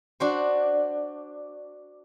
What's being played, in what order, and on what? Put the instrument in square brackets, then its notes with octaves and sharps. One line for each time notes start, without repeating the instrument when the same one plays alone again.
[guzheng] D4 F#4 C5